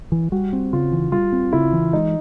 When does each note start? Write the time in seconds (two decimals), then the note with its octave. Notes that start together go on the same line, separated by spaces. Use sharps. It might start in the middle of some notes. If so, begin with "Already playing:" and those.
0.12 E3
0.32 G3 F#4
0.53 C4
0.73 C#3 F4
0.92 E3
1.12 G3 F4
1.32 C4
1.53 C#3 E4
1.73 E3
1.93 G#3 D#4